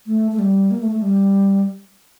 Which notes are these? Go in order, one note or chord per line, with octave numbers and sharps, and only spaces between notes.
A3
A3
G3
A#3
A3
A3
G3